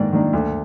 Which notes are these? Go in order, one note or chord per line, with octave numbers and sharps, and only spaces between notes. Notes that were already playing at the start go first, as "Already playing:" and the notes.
Already playing: G#2 D#3 A#3 D4 D5
D#3 A#3 D4
D2